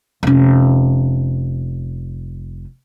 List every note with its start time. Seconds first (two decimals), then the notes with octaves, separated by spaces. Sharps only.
0.23 F1 C#4